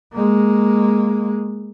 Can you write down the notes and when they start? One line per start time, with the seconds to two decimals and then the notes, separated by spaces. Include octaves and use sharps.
0.13 G#3 A#3